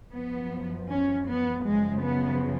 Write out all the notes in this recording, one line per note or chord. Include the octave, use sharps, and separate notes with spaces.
F#2 F3 B3
C#4
B3
F#2 C#3 F3 G#3
B3